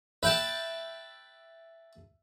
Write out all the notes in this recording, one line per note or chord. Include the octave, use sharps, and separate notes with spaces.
B4 E5 G5 A5